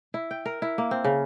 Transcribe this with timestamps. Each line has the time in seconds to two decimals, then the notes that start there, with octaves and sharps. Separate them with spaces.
0.14 E4
0.31 G5
0.46 A#4
0.62 E4
0.78 A#3
0.91 C4
1.04 C#3